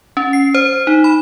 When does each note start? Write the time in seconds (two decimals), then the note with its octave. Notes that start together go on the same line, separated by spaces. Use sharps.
0.17 C#4
0.33 C7
0.55 C5
0.87 D#4
1.04 B5